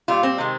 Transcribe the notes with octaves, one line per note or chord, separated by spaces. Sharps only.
A#2 G3 F4
C4
C3 D#3 G#3